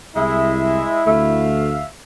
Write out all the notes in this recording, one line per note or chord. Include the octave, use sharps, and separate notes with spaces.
C2 G#3 E4 E5
D2 A3 E5 F5